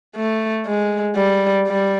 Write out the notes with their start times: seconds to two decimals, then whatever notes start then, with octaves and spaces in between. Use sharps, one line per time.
0.16 A3
0.66 G#3
1.16 G3
1.67 G3